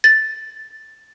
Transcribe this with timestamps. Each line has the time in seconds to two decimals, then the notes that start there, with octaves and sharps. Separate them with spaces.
0.04 A6